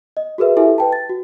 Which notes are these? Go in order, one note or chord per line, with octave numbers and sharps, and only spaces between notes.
D#5
F#4 G#4 A#4 B4 E5
E4 G4 A4 E5 G#5
B4 G5 A5
A6
F#4